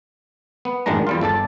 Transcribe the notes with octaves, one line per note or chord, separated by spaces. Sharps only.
B3
A1 F#2 D#3 G#3 D4 A#5
E2 G3 F4
G1 A4 D5 A5